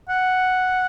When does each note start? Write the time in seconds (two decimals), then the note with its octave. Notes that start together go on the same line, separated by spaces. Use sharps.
0.09 F#5